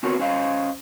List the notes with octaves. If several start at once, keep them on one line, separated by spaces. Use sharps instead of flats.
B3 C4 F#4 A#4 B4 C#5
C#4 C5 D#5 F5